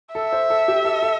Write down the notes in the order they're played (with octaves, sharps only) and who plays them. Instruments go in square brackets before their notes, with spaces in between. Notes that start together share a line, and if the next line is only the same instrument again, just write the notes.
[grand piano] A4 [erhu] E5
[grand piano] C5
A4
G4
A4
A4